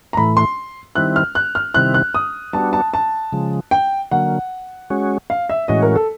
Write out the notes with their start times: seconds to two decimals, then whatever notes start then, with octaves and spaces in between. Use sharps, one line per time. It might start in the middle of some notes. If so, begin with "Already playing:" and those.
0.13 A#5
0.17 A2 E3 A3 B5
0.37 C6
0.95 D#3 G3 C4 E4 F#6
1.16 F6
1.35 F#6
1.55 F6
1.74 C3 D#3 G3 C4 E4 F#6
1.94 F#6
2.14 D#6
2.53 G3 B3 D4 F#4 A5
2.73 A5
2.94 A5
3.32 C#3 F3 G#3
3.71 G5
4.11 D3 F#3 A#3 F#5
4.90 G#3 C#4 F#4
5.30 F5
5.49 E5
5.68 A2 E3 G#3 C#4 F#4 D#5
5.82 A#4
5.96 A4